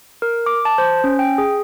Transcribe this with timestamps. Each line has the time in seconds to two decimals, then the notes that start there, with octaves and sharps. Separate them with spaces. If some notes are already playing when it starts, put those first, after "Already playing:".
0.22 A#4
0.46 D6
0.65 A5
0.78 C5
1.04 C#4
1.19 G5
1.38 G#4